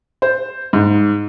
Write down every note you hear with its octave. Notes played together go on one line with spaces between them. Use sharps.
C5
G#2